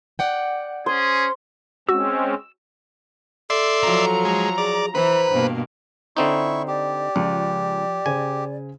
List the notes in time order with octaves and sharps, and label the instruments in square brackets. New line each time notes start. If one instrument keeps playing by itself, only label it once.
[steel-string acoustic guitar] D5 F#5 G5
[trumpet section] C#4 G#4 [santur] C5
[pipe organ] G#3 C4 C#4 [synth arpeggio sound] F#4 [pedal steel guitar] E6
[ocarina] A4 [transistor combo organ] D5 E5 C6
[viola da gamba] F3 F#3 [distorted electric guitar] A#5
[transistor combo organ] G#3
[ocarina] G#4 [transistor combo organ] D5
[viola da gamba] E3 [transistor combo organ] B4 [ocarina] C5
[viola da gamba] G2 B2 A#3
[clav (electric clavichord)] D3 C4 D#4 [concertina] E4 C#6
[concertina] G4 [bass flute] D5
[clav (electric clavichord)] C#2 [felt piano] F3
[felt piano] C#3 C5 [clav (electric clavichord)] G#5